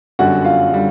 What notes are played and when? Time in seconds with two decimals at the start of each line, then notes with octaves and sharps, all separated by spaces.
0.19 G1 F#2 D3 G3 F#4 F#5
0.44 F4 F5
0.72 D3 G3